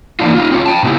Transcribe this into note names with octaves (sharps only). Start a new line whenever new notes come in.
E3 A#3 D4 D#4 F4
D#4 F4
C4 C#4 F4
G5 A5
A#2 C#3 B3 E4 G4